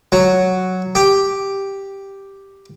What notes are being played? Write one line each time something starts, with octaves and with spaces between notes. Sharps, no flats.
F#3
G4